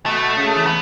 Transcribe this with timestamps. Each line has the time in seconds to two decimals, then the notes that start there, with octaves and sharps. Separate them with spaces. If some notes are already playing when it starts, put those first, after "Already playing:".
0.06 B2 A3
0.37 C#3
0.56 E3
0.67 B3